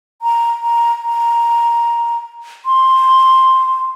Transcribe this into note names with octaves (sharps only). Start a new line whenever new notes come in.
A#5
A#5
A#5
C6